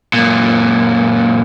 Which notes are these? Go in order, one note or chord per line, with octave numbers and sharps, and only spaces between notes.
F#2 A#2